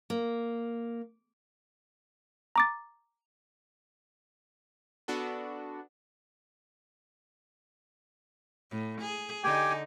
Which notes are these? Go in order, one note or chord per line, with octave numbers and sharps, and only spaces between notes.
A#3
A#5 D6 A6
B3 D4 F#4 A4
A2
G#4
D3 D#4 G4 G5 G#5